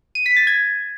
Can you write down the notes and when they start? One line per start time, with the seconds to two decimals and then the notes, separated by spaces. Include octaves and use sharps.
0.15 D#7
0.26 B6
0.36 A6
0.47 G#6